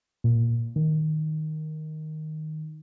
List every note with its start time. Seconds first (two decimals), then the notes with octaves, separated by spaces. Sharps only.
0.24 A#2
0.76 D#3